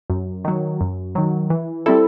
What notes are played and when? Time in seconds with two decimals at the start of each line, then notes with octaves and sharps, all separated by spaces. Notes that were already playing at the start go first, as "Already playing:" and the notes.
0.10 F#2
0.45 D#3 F#3
0.81 F#2
1.15 D#3 F#3
1.50 E3
1.86 G3 C4 E4 A4